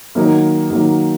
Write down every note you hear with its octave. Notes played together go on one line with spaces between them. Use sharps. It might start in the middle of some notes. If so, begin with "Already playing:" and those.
D#3 F#3 A#3
D#3 F#3 A#3